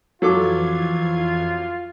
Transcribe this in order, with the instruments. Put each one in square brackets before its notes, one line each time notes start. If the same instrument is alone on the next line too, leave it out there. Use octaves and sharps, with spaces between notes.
[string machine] F2 E3 G#6 [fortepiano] F#3 A4 D6 [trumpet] F4